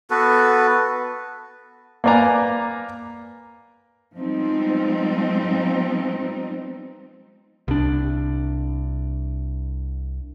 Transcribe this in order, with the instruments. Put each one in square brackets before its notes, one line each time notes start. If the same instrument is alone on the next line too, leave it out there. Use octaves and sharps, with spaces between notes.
[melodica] B3 F#4 A4 B4
[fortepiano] A#3 B4 D5 G#5 A#5
[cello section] F3 G3 G#3 B3 C4 D#4
[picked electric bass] C2 D4